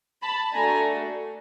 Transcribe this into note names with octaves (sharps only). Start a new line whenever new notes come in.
A5 B5
A3 D4 F#4 A4 G#5 A#5